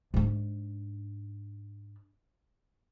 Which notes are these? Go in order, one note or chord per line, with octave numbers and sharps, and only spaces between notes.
G#2 D4